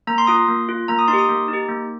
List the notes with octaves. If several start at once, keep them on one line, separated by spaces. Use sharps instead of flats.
A#3 A#5
C6
F4 D#6
C6
A#3
F4
A#3 A#5
D#6
D#4 C6
G4
D#6
A#3
D#4
G4
A#3